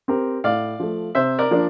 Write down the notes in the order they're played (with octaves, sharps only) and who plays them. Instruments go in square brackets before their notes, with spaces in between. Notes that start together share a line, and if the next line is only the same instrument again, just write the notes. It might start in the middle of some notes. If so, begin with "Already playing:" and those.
[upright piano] C4 G4 A#4
[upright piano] A2 [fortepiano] D5 F5
[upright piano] F3 A3
[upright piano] C3 [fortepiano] C5 E5
[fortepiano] A#4 D5
[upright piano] F3 A#3 D4